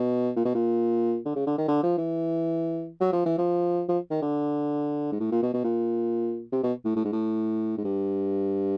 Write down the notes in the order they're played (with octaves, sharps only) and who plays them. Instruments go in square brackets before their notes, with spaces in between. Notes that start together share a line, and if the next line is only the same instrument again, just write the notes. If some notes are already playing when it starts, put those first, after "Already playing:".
Already playing: [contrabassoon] B2
A#2
B2
A#2
D3
C#3
D3
D#3
D3
F3
E3
F#3
F3
E3
F3
F3
D#3
D3
G#2
A2
A#2
B2
B2
A#2
C3
B2
A2
A2
G#2
A2
G#2
G2